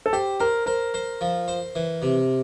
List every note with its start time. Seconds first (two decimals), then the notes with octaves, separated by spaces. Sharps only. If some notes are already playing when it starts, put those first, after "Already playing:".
0.06 A4
0.13 G4 C5
0.40 A#4 C5
0.66 A#4 C5
0.94 C5
1.21 F3
1.48 C5
1.75 E3
2.02 C3